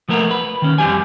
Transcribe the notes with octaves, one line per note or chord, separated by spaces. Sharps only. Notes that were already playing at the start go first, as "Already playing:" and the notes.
F3 A3 B3 A#4
B4
D#3 C#4
F2 G3 G4 G#5